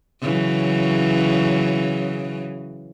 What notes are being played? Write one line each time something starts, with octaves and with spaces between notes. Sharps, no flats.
C#3 E3 F#3